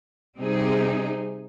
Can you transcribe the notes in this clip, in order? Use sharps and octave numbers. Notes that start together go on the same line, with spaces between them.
C3 G3 C4 D#4 G#4